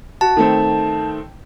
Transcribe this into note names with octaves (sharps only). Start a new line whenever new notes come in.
F#4 A5
D#3 A3 C4